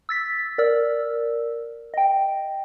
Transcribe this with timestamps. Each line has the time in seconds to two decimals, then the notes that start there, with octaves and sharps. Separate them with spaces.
0.09 E6 A6 B6
0.58 A#4 D5 E6
1.94 D#5 G5